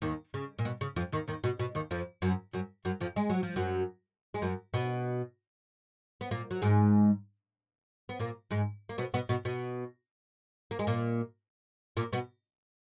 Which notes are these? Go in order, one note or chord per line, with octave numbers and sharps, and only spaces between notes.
D#2 D#3
C#3
A#2
B2
C#3
F2 F3
D#2 D#3
D#2 D#3
B2
B2
D#2 D#3
F2 F3
F#2 F#3
F#2 F#3
F#2 F#3
F2 F3
G#3
F#3
F3
F#2 F#3
G#3
F#2 F#3
B2 B3
B3
A#2 A#3
F#3
G#2 G#3
B3
A#2 A#3
G#2 G#3
A#3
B2 B3
B2 B3
B2 B3
B2 B3
A#3
G#3
A#2 A#3
A#2 A#3
B2 B3